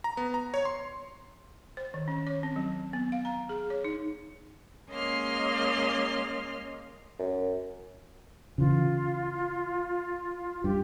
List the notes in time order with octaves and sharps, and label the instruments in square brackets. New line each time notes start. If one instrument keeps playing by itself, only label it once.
[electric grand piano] A#5
B3
A#5
C#5
C6
[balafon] C5
D#3
C#4
C#5
C4
F#3
B3
F5
A#5
G#4
C#5
D#4
[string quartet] G#3 A#3 C#4 D#5 C6 F6
[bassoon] F#2
[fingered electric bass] C#3 E3 [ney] F4
[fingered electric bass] G2 [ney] G4